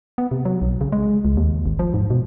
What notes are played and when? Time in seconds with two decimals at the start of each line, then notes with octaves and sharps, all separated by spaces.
0.18 B3
0.31 C3
0.45 F#3
0.62 B1
0.81 C#3
0.92 G#3
1.25 C#2
1.37 D#2
1.66 G#1
1.79 F3
1.94 G#2
2.10 B2